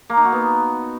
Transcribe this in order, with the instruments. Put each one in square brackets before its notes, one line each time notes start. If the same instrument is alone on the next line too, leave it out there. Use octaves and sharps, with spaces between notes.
[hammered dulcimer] A#3
D#4
F#4
B3